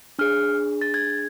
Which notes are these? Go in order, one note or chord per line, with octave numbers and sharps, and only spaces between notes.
D4 G#4 F6
A6
G#6